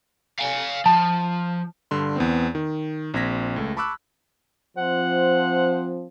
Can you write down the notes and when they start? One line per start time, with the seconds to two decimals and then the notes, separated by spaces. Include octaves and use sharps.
0.39 F5 G#5
0.86 F3 A5
1.91 G2 D3 C6
2.16 E2 B3 C4
2.55 D#3
3.14 A#1 C4 G#6 A#6 B6
3.56 C#2 A3
3.77 A5 B5 C#6 D6 E6 F#6
4.78 F3 C4 C5 F#5